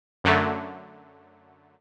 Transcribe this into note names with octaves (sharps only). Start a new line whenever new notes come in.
F#2 D3 F#3 A3